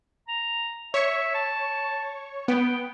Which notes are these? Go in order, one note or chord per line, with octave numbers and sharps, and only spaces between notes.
A#5
C#5 E5 C#6
A5
B3 G5